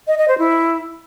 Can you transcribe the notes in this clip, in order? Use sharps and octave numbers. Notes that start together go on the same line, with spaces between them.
D#5
D#5
C5
E4